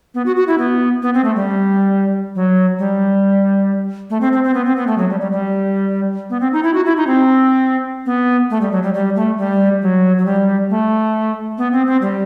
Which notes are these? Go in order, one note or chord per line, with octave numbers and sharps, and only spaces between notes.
B3
F#4
F#4
E4
B3
B3
C4
A3
G3
F#3
G3
A3
C4
C4
C4
B3
C4
B3
A3
F#3
G3
G3
G3
B3
C4
D#4
E4
F#4
E4
D#4
C4
B3
A3
G3
F#3
G3
G3
A3
G3
F#3
F#3
G3
A3
B3
C4
C4
G3